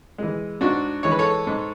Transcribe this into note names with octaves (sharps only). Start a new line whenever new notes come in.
E3 G#3
G#2 D4 F#4
E3 G#3 C#5
B4
A4 C#5
G#2